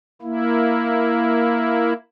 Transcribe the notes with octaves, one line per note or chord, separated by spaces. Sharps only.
A#3 E4